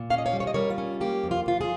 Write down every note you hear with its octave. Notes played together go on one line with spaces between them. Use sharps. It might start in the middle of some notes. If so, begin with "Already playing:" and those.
Already playing: A#2
C#4 F5
D#5
C#5 F5
G3
C#5
D#5
G3 A#4 C#5
F4
C#4
A#3 G4
F2
F4
F2 F4
F4 G#4